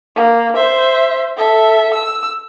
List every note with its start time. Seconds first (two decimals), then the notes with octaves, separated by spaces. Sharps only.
0.16 A#3
0.56 C5 E5
1.37 A4 E5
1.94 E6